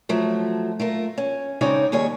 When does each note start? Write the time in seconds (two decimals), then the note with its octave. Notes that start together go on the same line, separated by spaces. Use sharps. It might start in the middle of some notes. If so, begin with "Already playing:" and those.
0.09 F3 F#3 A3
0.80 A3 F4 A#4
1.18 C#4
1.61 C#3 G#3 C4 D#4 C#5 D5
1.92 D#2 G3 G#4 C#5